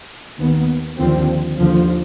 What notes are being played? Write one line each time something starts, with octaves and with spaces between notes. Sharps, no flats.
D#2 D#3 B3
D#2 D3 F3 C4
D#2 D3 F3